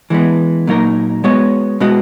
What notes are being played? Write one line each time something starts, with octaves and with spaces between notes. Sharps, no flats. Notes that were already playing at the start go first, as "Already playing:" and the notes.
E3 G#3 B3
A#2 F#3 A#3 D#4 A#4
G#3 B3 F#4 C#5
B2 G#3 B3 F#4